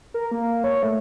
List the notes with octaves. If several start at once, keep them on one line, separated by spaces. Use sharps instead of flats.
A#4
A#3
C#5
A3